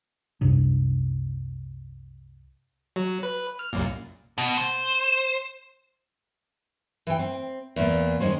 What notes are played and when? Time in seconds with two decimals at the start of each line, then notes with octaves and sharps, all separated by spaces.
0.41 C2 F#2 C3 D4
2.96 F#3
3.23 B4
3.59 F6
3.73 C2 F#2 A#2
4.38 B2
4.58 C5
7.07 E3 G5
7.19 C4
7.76 E2 A#2
8.20 D#3 G#3 C#4 C5